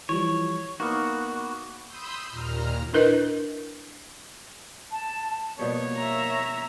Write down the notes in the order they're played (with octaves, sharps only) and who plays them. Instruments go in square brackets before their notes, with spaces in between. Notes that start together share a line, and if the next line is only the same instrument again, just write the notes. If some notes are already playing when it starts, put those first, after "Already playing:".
[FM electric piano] E3 F3 G3 [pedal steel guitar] C#5
[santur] A#3 B3 F5 [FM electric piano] D#4 C#6 [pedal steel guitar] F#4
[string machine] B5 C6 D#6 E6 G6
D#2 A#2 A#5 F6
[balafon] D4 E4 A#4 B4 D#5
[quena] A5
[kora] B2 F3 G3 [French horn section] A#3 [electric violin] B3 [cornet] C#5
[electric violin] E5 A#5